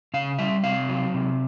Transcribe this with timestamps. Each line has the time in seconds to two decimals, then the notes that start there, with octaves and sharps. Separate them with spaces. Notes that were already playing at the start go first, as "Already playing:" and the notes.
0.14 C#3 F5
0.39 G3 E5
0.64 C3 F5
0.89 F#3
1.14 C3